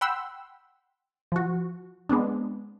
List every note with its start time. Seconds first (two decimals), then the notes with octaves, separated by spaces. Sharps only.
0.01 F#5 G5 B5 C6 E6
1.32 F3 F#4
2.09 G#3 B3 C4 D4